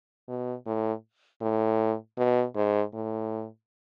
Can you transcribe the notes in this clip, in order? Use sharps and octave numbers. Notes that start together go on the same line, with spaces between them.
B2
A2
A2
B2
G#2
A2